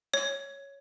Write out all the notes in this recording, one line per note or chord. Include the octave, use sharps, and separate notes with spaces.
C#5